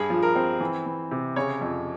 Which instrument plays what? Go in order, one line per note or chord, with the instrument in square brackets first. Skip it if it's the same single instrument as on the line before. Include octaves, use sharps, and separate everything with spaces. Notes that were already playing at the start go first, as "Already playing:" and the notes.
Already playing: [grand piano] G2 G#4
F3
A#4
C4
E3
E3
C3
C#3 C#5
F2